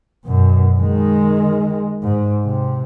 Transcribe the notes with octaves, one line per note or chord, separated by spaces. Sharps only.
F#2 B2
D#3 G#3
G#2
C3